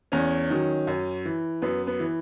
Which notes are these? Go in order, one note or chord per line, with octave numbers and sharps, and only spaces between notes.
E2 C#4
D#3 F#3
F#2
E3
F#2 B3
B3
E3